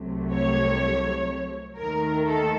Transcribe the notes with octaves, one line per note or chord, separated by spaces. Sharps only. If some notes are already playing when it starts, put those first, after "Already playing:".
Already playing: C2 C3 F#3 A3
C#5
D#2 D#3 A3 A#4
A4